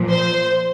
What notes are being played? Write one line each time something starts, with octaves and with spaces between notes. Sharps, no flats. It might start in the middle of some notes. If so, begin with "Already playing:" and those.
Already playing: A#2 F3
C5